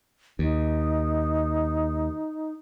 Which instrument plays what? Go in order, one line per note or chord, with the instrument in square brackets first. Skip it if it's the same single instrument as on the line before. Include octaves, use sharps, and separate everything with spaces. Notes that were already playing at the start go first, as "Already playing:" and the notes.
[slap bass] D#2 [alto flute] D#4